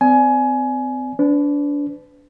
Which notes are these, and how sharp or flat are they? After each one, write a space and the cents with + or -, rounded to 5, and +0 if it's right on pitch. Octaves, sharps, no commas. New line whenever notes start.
C4 -35 D5 -10 G#5 +20
D4 -25 B4 +35